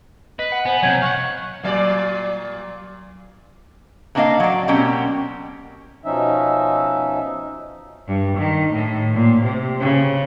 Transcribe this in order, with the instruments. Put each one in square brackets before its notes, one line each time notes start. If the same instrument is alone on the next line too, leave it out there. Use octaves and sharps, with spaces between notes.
[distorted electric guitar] B4 [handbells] D#5
[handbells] F#5
[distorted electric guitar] B3 [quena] C5 [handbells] G#5
[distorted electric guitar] C3 F#3 [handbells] C#5 G6 [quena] G#6
[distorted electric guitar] F5 F#5 [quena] C#6
[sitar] A#2 F#3 D5
[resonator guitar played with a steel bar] A2 A#3 D4 D#4 D#5 F5
F#3 D5
B2 A#3 C4 C#4 G4
[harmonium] B2 F3 C#4 D#4 E5
[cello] G2
D#3
A2
A#2
C3
C#3